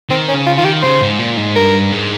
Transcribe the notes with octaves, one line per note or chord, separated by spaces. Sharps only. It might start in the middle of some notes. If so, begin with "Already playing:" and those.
D#3 C4
C#4
C#3
F4
D#3 F4
G4
C#3 C5
G#2
A#2
G#2
G2 A#4
G#2